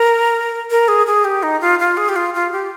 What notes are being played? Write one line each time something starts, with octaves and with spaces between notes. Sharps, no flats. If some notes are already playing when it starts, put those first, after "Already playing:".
Already playing: A#4
A#4
G#4
G#4
G4
D#4
F4
F4
G#4
G4
F4
F4
G4